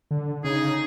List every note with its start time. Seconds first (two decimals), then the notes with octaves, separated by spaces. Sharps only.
0.11 D3
0.44 C#3 D#4 G#4